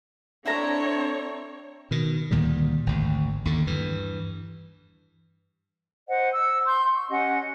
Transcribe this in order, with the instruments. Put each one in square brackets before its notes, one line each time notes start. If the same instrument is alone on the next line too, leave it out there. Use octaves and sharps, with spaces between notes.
[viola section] C4 C#5 [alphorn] D4 [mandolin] E4 A4 A#5
[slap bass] B2 D#3
D2 A#2 D#3 G3
G#1 D2
D#2 D3
G2 E3
[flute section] C5 D#5 F#5
E6
C6 G6
C#6
C#4 G4 D#5 F#5